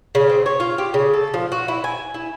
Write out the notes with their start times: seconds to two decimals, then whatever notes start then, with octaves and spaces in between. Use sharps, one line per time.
0.15 C#3
0.30 C4
0.46 C#5
0.60 F4
0.78 G4
0.94 C#3
1.13 A4
1.34 F3
1.52 F#4
1.68 E4
1.84 G#5
2.14 E4